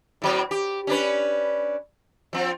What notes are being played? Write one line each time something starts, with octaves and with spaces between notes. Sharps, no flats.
A2 F#3 C4
G4
C#4 D4 B4
F3 C4